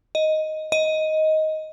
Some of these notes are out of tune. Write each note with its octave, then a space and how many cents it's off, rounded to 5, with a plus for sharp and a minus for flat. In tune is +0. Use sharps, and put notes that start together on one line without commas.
D#5 +5
D#5 +10